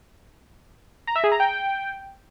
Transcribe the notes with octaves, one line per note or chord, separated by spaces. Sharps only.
A#5
E5
G#4
A#5
G5